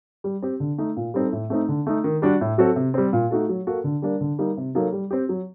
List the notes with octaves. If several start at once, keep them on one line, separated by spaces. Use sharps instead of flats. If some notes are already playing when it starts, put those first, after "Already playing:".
G3
C4 G4
D3
A3 D#4
A#2
G3 C4 D#4 A4
A2
A3 C4 D#4
D3
A3 D#4
D#3
G3 D4 F#4
A2
F#3 C4 F#4 A4
C3
G3 C4
A#2
A3 D#4 F#4 A4
F#3
A#3 F#4 A4
D3
G3 A#3 D4
D3
G3 A#3 D#4
C3
F#3 A#3 D#4 A4
G3
C4 G4
F#3